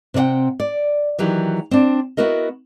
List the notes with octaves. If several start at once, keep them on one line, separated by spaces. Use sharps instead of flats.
C3 C4 D5 F#5 G5
D5
D#3 E3 F#3 G4
C4 D4
B3 E4 F#4 A#4 D#5